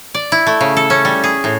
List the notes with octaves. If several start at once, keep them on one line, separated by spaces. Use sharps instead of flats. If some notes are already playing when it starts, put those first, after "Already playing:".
D5
E4
A3
C#3
A4
C#4
G3
G#4
A2